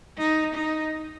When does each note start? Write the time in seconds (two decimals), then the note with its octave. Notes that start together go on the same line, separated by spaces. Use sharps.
0.17 D#4
0.54 D#4